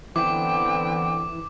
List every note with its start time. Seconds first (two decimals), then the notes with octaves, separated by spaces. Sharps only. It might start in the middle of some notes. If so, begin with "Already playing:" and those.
0.16 D3 E3 B3 C4 G5 D6